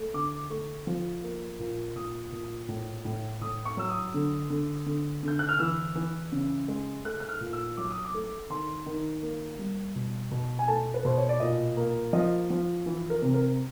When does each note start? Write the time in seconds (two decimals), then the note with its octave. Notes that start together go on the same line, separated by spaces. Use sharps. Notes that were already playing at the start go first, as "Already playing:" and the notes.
Already playing: A3
0.14 D3 D6
0.50 A3 C#6
0.87 F3
1.23 A#3
1.59 A#2
1.96 A#2 D#6
2.32 A#2
2.68 A2
3.05 A2
3.41 A2 D#6
3.65 C#6
3.77 F#3 E6
3.89 D#6
4.14 D3
4.50 D3
4.86 D3
5.23 D3 G6
5.39 F#6
5.49 F6
5.59 E3 E6
5.95 E3
6.32 C#3
6.68 G#3
7.05 A3 F#6
7.20 F#6
7.29 F6
7.41 A#2
7.53 E6
7.77 F#3 D6
7.91 D#6
8.05 D6
8.14 A3
8.50 D#3 C6
8.86 D#3
9.22 A#3
9.59 G3
9.95 B2
10.31 B2
10.59 G#5
10.68 A3 A5
10.94 B4
11.05 B2 C5
11.18 C#5
11.29 D5
11.40 A#2 D#5
11.77 A#3
12.13 F3 D#5
12.50 F3
12.86 E3
13.10 A#4
13.22 C3
13.34 A#4